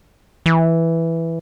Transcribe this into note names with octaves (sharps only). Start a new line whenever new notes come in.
E3